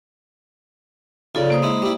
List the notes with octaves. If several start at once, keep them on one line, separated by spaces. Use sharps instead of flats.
B1 C#3 F4 A4 D5
A#3 C5 D#6
G#3 E4
G3 E4